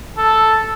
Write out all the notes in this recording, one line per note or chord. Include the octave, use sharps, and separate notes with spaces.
A4